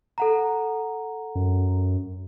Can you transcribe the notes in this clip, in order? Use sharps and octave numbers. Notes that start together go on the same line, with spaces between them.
A4 F#5 A#5
F#2